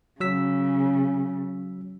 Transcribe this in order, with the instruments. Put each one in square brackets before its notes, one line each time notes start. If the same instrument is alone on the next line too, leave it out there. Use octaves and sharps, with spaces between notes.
[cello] C#3 [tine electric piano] F#3 E6 B6